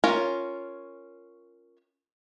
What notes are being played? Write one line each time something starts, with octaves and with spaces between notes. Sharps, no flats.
C#4 F4 A#4 C#5